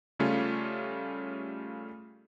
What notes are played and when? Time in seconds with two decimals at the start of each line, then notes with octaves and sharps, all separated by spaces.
0.19 C#3 G3 A3 C#4 F4